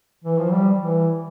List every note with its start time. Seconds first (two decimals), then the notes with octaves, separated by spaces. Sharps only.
0.24 E3
0.39 F3
0.52 G3
0.79 E3